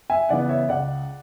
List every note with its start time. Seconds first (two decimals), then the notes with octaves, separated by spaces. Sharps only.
0.10 E5 G#5
0.29 C#3 E3 B3 D5 F#5
0.49 C#5 E5
0.69 C#2 D5 F#5